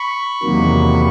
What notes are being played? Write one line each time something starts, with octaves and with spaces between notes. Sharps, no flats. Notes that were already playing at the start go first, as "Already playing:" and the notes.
Already playing: B5 C#6
E2 C3 D#3 F#3 A#3